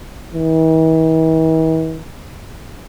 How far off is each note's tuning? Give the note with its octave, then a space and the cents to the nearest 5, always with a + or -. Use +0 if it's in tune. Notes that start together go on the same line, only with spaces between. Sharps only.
E3 -45